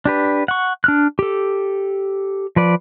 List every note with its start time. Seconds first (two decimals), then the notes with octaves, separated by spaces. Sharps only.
0.05 D4 G4 B4
0.48 F#5 C#6
0.84 D4 F6 F#6
1.19 G4 A4
2.56 F3 B4 D5